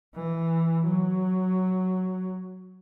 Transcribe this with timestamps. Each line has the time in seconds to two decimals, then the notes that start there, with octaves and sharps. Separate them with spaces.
0.15 E3
0.84 F#3